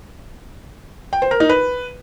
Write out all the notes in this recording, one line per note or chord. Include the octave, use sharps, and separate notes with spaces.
G5
C5
A#4
D#4
B4